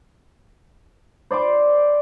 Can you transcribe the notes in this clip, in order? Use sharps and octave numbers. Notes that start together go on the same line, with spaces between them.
C5 D5 C6 D6